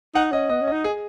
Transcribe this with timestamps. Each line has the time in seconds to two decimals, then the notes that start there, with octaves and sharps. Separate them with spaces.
0.15 D#4 F#5
0.32 C#4 D#5
0.49 B3 D#5
0.62 C#4
0.68 D#5
0.72 D#4
0.84 G#4